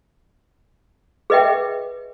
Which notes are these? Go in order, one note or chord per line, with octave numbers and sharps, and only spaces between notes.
G#4 B4 D#5 E5 G5